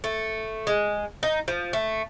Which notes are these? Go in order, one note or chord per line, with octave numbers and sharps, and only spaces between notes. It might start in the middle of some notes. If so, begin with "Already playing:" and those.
A3
G#3
D#4
F3
A3